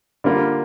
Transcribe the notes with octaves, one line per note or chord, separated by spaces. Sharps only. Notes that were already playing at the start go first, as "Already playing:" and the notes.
D3 G3 A#3 F4